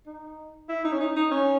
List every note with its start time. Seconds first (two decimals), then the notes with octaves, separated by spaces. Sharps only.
0.07 D#4
0.69 E4
0.85 D#4
0.92 C#4
1.00 D#4
1.16 D#4
1.31 C#4